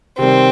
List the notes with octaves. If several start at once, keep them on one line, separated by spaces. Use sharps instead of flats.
C3 D#3 G3 C4